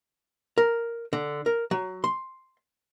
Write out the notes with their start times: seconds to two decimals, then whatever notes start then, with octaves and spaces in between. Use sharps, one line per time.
0.58 A#4
1.13 D3
1.46 A#4
1.71 F#3
2.04 C6